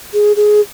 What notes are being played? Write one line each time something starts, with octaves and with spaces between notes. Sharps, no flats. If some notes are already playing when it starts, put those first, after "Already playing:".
G#4
G#4